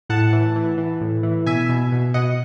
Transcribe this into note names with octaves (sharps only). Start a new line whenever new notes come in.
A2 F#5 A5
E3
E3
E3
A2
E3
B2 E5 G#5
B2
B2
B2 D#5 F#5